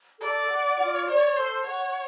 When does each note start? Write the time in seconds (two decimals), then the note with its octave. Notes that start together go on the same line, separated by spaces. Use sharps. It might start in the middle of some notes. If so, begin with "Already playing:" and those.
0.20 A4 D5
0.50 F#5
0.79 F4
1.07 C#5 D5
1.36 A4 C5
1.66 C#5 F#5